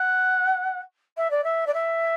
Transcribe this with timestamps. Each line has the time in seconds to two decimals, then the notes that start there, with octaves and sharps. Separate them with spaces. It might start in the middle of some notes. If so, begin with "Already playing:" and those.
Already playing: F#5
1.17 E5
1.30 D5
1.44 E5
1.66 D5
1.74 E5